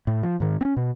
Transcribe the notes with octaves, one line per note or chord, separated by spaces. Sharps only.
A2
F3
G#2 D#3
C4 C#4
B2